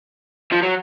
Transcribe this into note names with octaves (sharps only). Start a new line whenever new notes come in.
F3
F#3